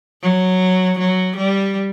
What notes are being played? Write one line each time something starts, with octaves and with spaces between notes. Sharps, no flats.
F#3
F#3
G3